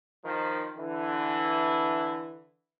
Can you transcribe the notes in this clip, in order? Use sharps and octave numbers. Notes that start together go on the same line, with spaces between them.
D#3 F3
D3 E3